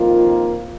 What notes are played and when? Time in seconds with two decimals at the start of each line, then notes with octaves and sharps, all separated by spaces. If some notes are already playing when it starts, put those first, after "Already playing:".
Already playing: F2 D#3 A#3 F4